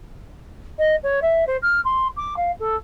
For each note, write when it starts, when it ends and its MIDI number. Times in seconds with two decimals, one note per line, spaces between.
0.79 0.96 75
1.03 1.20 73
1.22 1.45 76
1.47 1.57 72
1.62 1.81 89
1.85 2.08 84
2.17 2.34 86
2.37 2.52 77
2.60 2.76 69